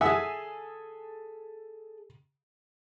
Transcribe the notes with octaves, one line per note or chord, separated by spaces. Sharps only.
G#4 A4 E5 F#5 G#5 D#6